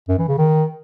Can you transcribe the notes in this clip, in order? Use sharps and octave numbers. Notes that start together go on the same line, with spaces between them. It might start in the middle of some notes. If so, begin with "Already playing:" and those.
F#2
E3
C#3
D#3